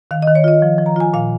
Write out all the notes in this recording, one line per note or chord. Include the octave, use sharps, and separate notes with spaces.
D#3 F5
D#5
D#3
C#5
F4 D#5
F3
F3
A#5
F4 G#5
A#2 F5